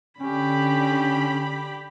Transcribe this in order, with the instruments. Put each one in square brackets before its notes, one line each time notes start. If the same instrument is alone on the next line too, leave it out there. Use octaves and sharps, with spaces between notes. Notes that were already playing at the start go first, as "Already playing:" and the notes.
[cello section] D3 [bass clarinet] C#4 [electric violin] G4 B5